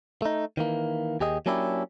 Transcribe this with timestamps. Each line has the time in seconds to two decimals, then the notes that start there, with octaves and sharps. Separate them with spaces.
0.22 A3 D#4
0.57 D#3 E3 A#3
1.20 D#2 G4 G#4 D#5
1.46 F#3 A#3 C#4 D4 E4 G4